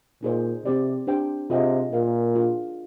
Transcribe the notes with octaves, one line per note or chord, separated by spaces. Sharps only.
A#2 D#4 G#4 C5
C3 C4 G4 D5
D4 G4 C5 G5
C3 F4 G#4 D#5 G5
A#2 F4 A#4 F5
D4 F4 G#4 D5